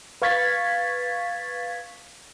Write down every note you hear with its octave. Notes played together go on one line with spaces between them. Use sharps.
B4 F5 C#6 G#6 A6 B6